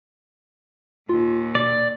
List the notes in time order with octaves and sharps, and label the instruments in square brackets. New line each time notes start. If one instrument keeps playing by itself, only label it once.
[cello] D#2 A#2 [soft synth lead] F4
[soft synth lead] B2 [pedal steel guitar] D5